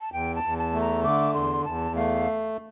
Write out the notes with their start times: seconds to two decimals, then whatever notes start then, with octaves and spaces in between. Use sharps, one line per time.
0.01 A5
0.12 E2 G5
0.35 A5
0.43 E2
0.58 A5
0.73 A3
0.80 A#5
1.03 D3 D6
1.34 E2 C6
1.65 E2 A5
1.95 A3 F5